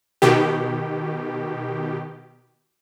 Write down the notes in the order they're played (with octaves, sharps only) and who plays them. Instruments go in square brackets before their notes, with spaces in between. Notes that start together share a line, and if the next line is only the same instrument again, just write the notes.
[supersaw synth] B2 D#3 G4